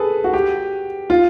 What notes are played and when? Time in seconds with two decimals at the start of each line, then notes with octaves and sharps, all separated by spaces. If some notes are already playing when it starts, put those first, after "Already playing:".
Already playing: G#4 A4 B4
0.24 F#4
0.33 G4
1.10 F4